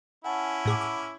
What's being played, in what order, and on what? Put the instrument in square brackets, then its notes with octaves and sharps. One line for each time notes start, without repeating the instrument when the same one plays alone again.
[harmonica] C#4 E4 [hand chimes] F#5 G#5 A5
[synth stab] A2 G#4 D6
D6